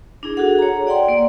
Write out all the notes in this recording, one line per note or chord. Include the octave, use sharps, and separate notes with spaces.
D4 E4 G#4
F#4 G#4 A4 F#5
C#5 A#5
D5 F#5 G5 C6
A#3 D5